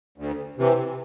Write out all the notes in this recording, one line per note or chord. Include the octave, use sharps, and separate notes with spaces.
D2
C3 E3